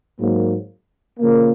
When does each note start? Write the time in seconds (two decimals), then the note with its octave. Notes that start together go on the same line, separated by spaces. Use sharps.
0.19 G#2 F#3 A#3
1.18 C#3 F3 A#3